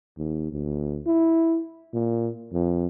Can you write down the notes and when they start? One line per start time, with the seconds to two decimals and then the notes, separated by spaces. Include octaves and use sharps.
0.18 D#2
0.52 D2
1.07 E4
1.93 A#2
2.53 F2